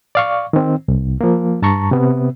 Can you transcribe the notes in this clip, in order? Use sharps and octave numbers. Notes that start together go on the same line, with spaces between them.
D5 F5 C#6
D#3 C4
C2
F3 A#3
G2 A5 A#5 C#6
C3 B3